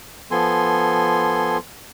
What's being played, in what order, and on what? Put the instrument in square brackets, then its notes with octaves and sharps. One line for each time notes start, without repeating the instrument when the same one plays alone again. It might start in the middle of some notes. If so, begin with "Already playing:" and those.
[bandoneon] F3 B3 A4 G#5 C6